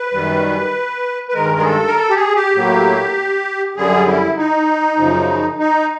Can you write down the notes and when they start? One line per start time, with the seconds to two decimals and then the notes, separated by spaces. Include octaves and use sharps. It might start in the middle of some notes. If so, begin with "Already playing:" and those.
Already playing: B4
0.13 F#2 D#3 G3
1.28 B4
1.34 G2 D#3 G#3 A#4
1.60 G#4
1.64 A4
1.87 A#4
1.95 A4
2.10 G4
2.15 G#4
2.35 G4
2.55 A2 F#3 A#3
3.76 F#2 D3 G3 G#4
4.07 E4
4.37 D#4
4.98 F#2 C#3 F3
5.59 D#4